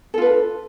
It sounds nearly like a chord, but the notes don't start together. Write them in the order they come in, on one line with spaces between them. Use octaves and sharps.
A4 F4 B4 D4